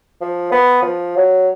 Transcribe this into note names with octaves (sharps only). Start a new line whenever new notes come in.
F3
B3
F3
F#3